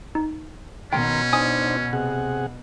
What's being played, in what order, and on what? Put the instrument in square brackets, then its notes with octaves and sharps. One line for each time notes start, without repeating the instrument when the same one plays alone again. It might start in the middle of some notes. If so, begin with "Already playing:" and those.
[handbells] D#4
[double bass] B2 [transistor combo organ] D#3 A#5 C6 [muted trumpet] C#4 [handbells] G5
[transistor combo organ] D4 D#4 C5 [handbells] G#5 D#6
[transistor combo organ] C3 G#4 F#5